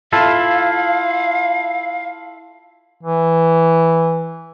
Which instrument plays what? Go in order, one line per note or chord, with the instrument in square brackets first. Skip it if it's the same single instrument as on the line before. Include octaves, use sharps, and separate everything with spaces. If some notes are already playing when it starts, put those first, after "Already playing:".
[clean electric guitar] E4 F4 A4 [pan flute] F5
[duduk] E3